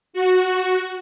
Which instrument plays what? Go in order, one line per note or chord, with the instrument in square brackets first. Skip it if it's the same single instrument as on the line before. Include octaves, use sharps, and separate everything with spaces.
[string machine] F#4